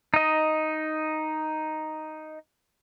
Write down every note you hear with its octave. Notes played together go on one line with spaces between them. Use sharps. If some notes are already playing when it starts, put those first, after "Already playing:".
D#4 D#5